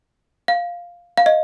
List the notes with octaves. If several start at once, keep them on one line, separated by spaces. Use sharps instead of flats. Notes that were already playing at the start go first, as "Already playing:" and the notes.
F5
F5
D#5